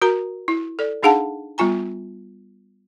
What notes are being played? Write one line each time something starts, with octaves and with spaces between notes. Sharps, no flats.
F#4 A#4 A#5
E4
A4 D5
D4 D#4 G#4 F5 F#5 A5
G3 B3 F4 G#5 A#5